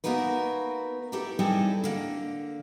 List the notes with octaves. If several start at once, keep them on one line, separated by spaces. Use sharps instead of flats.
A#3 B3 D#4 F#4 A#4 B4
E4 G4 A4 A#4
G3 C4 D#4 E4 G#4 A4
D3 A#3